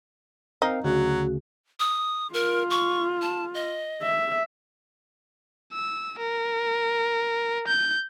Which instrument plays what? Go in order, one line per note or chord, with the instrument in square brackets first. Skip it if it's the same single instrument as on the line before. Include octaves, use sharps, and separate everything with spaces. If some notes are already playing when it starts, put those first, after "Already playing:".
[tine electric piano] C4 A#4 F5 [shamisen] D#4
[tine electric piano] D2 C#3 [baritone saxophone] F#3 [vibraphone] F#4
[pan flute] D#6
[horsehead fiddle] F4 [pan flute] A#4
[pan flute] C#6
A5
D#5
[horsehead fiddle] E5
[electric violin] E6
A#4
G6